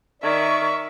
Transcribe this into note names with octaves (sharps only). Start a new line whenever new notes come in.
D#3 D5 E5 C#6